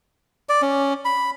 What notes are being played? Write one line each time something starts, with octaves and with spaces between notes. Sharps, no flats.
D5
C#4
B5